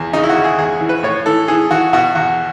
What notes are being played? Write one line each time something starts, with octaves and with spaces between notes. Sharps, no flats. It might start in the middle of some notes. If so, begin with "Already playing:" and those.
Already playing: E2
C#3 D#4
E4
F#4
C#3
G#4
E2 G#4
E3
B4
A2 C#5
E3 A4
E3 G#4
E3 F#4
B2 F#4
E2 F#4